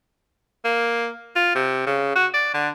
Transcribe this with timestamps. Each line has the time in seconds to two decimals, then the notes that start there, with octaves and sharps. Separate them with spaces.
0.65 A#3
1.36 F4
1.55 C3
1.87 C#3
2.16 F#4
2.34 D5
2.54 D3